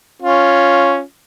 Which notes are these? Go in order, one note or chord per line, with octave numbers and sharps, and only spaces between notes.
C#4 F4